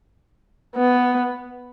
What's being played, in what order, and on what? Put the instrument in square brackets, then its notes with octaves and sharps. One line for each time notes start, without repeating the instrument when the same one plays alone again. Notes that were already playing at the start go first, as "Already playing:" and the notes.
[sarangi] B3